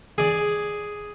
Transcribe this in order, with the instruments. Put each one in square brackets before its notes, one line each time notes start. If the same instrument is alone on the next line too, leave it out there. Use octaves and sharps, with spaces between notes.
[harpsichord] G#4 D5